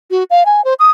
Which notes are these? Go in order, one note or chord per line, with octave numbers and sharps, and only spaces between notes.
F#4
F5
G#5
C5
D#6